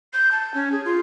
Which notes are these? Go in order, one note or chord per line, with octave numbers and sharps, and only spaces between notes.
G6
A5
C#4
G#4
F4